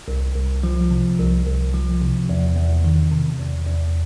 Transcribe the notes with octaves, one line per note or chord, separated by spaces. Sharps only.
C2
C2
F3
C3
C2
C2
F3
C3
E2
E2
D#3
C3
E2
E2